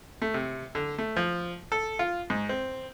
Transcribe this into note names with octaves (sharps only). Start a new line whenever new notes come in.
A3
C3
D3
A3
F3
A4
F4
G#2
C4